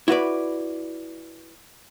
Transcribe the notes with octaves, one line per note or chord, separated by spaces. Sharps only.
E4 F#4 B4 D5